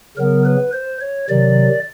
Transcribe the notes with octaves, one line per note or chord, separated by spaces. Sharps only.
C#3 F#3 B3 A#4
B4
C5
C#5
C3 D#3 F#3 D5